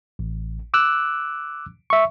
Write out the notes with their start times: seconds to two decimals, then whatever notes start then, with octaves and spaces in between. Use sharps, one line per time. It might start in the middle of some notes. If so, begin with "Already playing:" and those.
0.19 A1
0.74 D6 E6 F#6
1.90 E5 C#6